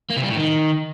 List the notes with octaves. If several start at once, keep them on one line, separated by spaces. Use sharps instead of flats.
A#3
C3
G3
A2
D#3